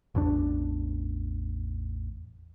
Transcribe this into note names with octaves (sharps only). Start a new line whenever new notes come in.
A1 E2 D4